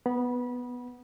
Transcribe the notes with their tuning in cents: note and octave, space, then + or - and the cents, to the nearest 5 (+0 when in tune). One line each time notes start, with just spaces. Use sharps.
B3 +0 B5 -25